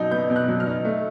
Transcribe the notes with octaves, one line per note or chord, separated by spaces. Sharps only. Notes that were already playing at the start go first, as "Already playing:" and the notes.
Already playing: B2 F#3 D#4 G6
B3 G6
B2
F#6
F#3
F6
D#4
A3